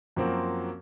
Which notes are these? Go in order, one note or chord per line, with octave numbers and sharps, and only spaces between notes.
F#2 F3 A#3 C4 F#4